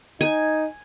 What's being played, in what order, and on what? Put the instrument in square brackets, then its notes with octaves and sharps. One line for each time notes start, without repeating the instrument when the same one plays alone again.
[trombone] D#4 [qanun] G#5